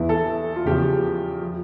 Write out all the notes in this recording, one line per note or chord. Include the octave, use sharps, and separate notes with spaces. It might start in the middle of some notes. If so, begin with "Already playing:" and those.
Already playing: E2 E3
A4
F4
E2 C#3 F3 G4
F3